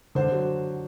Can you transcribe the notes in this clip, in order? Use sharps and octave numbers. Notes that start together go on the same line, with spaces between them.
D3 C5
F#3